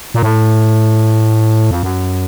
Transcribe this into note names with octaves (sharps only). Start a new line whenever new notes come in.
A#2
A2
F2
F#2